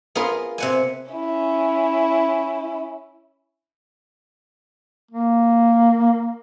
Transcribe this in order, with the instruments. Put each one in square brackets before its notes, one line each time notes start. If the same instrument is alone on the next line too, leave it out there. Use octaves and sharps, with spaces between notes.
[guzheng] B3 F4 G#4 A#4
C3 F#5 G#5
[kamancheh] C#4 E4
[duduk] A#3